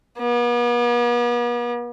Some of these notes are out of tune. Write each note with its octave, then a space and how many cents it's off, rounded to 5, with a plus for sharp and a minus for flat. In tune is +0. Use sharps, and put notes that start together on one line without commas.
B3 -40